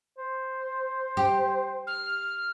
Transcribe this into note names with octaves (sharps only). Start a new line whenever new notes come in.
C5
G4
F6